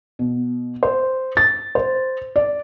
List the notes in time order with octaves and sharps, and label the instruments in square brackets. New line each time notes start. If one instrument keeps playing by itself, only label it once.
[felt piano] B2
C5
A6
C5
D5